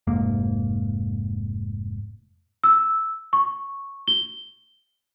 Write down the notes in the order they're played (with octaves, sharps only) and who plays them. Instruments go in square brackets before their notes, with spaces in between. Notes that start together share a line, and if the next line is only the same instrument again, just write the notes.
[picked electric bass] F1 G#2 A#3
[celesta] E6
C#6
G7